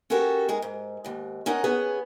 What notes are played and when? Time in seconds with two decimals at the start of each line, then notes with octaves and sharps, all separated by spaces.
0.10 C#4 F#4 G4 A4 A#4 C#5
0.49 G#3 G#4 A#4
0.62 G#2
1.04 D#2 G#2
1.46 C#4 D#4 A#4 F#5
1.64 B3 C#4 G#4